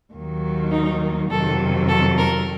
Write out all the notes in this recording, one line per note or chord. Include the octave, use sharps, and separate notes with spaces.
D#2 D#3 F#3
D#4
F2 C3 D#3 F#3 A4
A4
A#4